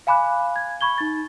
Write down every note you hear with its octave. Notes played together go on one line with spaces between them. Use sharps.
F5 G#5 B5 D6 F#6
G#6
B5 C#6 G#6 G7
D#4 A6